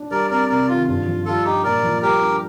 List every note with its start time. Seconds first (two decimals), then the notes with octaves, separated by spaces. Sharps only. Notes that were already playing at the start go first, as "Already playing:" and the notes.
Already playing: D4
0.11 G3 A#4 D5
0.30 C4 A#4 D5
0.49 C3 A#4 D5
0.68 D#3 F4
0.87 G2 F4
1.07 F3
1.25 G3 F4 A4
1.45 D4 D#4 G4
1.64 A#2 A#4 D5
1.83 F3
2.02 G3 G4 A#4
2.21 D4